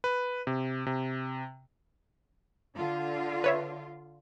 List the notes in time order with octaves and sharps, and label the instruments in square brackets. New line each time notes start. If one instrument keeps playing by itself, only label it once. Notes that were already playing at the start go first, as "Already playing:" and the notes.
[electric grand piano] B4
C3
C3
[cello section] D3 F4
[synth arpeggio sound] B4 C#5 E5